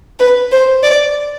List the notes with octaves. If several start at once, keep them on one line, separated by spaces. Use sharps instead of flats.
B4
C5
D5